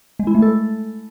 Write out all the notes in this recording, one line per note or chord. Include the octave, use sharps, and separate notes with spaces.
G#3
E4
A3
A4